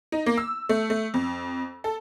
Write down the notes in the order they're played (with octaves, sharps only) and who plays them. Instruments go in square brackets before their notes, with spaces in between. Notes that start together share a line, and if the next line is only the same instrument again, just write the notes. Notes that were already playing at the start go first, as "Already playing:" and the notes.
[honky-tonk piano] D#4
A#3
E6
A3
A3
F2
A4